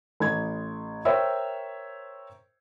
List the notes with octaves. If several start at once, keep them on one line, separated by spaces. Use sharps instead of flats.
A1 G#6
A#4 C5 C#5 E5 G5